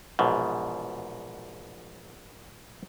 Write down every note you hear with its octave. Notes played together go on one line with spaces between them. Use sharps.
A#1 E2 G#2 B2